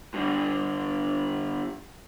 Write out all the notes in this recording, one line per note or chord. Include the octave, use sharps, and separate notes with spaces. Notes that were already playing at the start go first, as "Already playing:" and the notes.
G2 D3